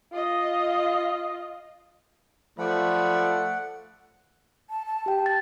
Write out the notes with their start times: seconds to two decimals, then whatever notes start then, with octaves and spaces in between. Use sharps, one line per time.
0.12 F4 D#5
2.59 F3 A3 D5 F#5 B5
4.70 A5
4.86 A5
5.06 G4 G5
5.26 A6